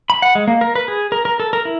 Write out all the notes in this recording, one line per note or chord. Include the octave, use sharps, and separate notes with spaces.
B5
F#5
G#3
A#3
A#4
B4
G#4
A#4
A#4
A4
A#4
E4